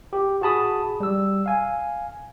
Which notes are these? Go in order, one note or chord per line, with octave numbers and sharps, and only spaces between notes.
G4
F#4 G#4 A5 B5 D#6
G3 E6
F5 G#5